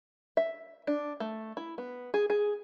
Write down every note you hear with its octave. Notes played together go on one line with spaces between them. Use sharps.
E5
D4
A3
E4
B3
G#4
G#4